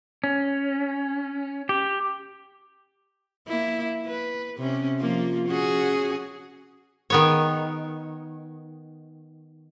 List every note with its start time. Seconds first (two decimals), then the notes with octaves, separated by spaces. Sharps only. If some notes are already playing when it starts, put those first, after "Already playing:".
0.24 C#4
1.69 G4
3.47 A#3 E4
4.06 B4
4.58 C3 C#4
5.00 F3 A#3 F4
5.49 C#4 F#4 G#4
7.10 D#3 B3 C#5